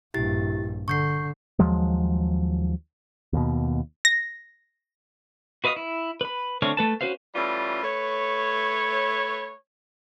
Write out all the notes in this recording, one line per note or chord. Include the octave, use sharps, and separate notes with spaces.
A#1 G2 E4 G4 A6
D3 C#6 G6 C7
D#2 F3 F#3 G#3
D#2 B2
A#6
F#4 B4 D#5 F5 D#6
E4
B4 B5
D3 A3 C4 C#5 F6
A3 B4 A5
C#4 F#4 B4 C5 F5
E3 G3 A3 C#4 F4
A3 B4 C#5